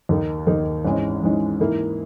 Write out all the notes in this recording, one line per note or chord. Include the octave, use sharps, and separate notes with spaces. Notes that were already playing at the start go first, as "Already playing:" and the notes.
D#2 D#3 A#3 D#4
D#2 D#3 A#3 D#4
G#1 G#2 E3 G#3 C#4
G#1 G#2 E3 G#3 C#4
G#2 E3 A#3 E4